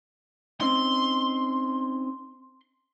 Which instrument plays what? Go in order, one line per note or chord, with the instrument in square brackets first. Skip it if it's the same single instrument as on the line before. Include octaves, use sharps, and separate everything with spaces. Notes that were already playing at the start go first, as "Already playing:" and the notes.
[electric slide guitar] C4 C#4 D#4 [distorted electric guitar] C6